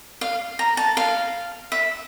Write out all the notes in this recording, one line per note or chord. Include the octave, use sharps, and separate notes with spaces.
F5
A#5
A5
F5
E5